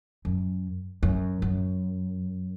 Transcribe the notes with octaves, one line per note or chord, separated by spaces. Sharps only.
F#2
F#2
F#2